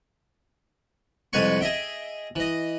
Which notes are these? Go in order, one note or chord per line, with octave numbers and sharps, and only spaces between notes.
C2 F2 G#3 B4 G#5 C#6
G#4 D#5 E5 G5
E3 D#5